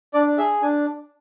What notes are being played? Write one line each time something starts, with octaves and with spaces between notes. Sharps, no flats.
D4 D5
G#4 E5
D4 G#5